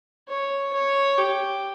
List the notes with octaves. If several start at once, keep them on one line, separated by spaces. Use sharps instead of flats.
C#5
C#5
G4